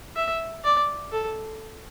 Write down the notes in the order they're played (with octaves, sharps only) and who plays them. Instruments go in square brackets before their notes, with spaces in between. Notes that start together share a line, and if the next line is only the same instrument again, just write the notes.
[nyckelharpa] E5
D5
A4